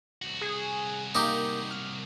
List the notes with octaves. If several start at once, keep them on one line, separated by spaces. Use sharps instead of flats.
C2 F#4
G#4
A#3 D#4 G4
F6